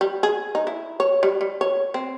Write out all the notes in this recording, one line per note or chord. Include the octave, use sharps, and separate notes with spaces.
G3
G#4
D#4
E4
C#5
G3
G3
C#5
C4